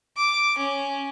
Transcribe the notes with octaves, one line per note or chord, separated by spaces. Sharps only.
D6
C#4